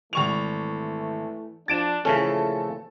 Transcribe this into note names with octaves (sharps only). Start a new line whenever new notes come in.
G#1 E3 A3 C#6 F7
F3 D4 A6 D7 E7
A#2 C#3 E3 F3 A3 C#4 A4